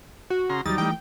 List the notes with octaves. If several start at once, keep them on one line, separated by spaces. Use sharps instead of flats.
F#4
C#3 A#5 C6
D#2 F#3 G3 D#4 A6
E3 A3 G5